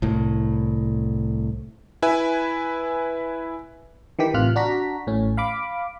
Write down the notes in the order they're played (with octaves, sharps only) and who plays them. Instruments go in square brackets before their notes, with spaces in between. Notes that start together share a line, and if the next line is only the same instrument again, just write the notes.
[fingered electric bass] C2 A2
[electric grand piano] E4 B4 E5 G#5
[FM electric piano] D#3 E3 G4 B6
A1 C3 F4 F6 F#6
D4 F#4 A#5 B6
A1 A2 C#4
F5 B5 D6